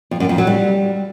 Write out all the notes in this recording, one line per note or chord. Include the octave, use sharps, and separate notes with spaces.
F2
F#2
F2
F#3
G3